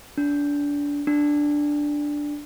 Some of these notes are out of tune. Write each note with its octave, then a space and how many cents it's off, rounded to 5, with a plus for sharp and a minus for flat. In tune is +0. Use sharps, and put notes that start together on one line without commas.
D4 -25
D4 +0